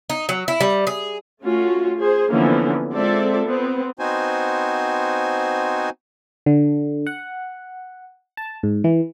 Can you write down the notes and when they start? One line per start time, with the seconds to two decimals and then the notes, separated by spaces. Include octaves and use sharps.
0.10 D#4
0.29 F#3
0.48 E4
0.60 G3
0.87 G#4
1.42 A3 C#4 F4 F#4
1.98 G#4 C5
2.30 D3 E3 F3 A#3 B3 C#4
2.92 G#3 C4 F4 A4 D5 E5
3.46 B3 C4
3.99 B3 C4 D#4 F#4 C5 G#5
6.46 D3
7.07 F#5
8.37 A5
8.63 G#2
8.84 E3